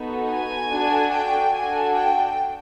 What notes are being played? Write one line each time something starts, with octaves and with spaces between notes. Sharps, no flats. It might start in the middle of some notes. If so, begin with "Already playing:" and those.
Already playing: B3 D#4 F#4 A4
G#5
D4 F#4 A4
G5
D4 F#4 A4 G#5
G5